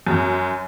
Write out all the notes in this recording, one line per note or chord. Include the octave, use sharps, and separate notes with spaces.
F#2